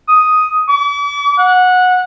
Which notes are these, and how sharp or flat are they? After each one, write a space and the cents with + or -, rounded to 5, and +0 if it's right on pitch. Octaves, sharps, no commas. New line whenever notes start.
D#6 +5
D6 -45
F#5 -15